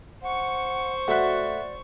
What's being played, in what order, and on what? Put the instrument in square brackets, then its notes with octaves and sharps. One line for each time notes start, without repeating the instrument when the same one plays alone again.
[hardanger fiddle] C5 C#6 [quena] F#5
[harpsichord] A3 B5 [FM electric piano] F#4 F#5 [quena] D5